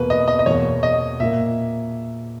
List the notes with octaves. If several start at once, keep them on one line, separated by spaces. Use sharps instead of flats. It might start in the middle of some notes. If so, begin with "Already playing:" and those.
Already playing: E2 B2 A#3 B4
D#5
D#5
D#5
E2 B2 A#3 C#5
D#5
A#2 A#3 E5